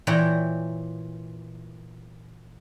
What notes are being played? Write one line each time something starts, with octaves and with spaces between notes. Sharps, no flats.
A#2 E3 C#5 G5 A#5